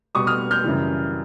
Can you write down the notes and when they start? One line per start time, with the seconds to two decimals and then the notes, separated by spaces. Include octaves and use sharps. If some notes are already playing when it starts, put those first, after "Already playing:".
0.15 B2 G3 C#6 D#6
0.27 D#6 F6
0.51 F6 G6
0.64 F#2 C#3 E3 G3